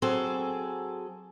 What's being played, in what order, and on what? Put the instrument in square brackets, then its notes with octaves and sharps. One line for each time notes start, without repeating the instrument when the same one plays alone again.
[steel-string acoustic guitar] F#3 C4 G#4 A4